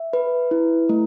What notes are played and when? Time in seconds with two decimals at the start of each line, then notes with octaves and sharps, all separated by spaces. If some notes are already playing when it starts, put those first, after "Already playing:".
Already playing: E5
0.13 B4
0.51 E4
0.89 A3